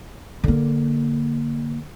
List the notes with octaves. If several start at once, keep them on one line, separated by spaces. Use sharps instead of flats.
D3 A#3